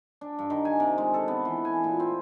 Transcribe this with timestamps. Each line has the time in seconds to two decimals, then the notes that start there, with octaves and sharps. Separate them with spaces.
0.21 D4
0.39 G2
0.50 D#3
0.65 G#5
0.80 C3
0.98 G#3
1.14 A4
1.28 B3
1.45 E3
1.65 G#5
1.84 A#2
2.00 C4